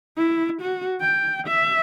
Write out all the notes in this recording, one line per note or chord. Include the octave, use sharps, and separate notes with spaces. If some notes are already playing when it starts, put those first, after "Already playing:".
E4
F#4
G5
E5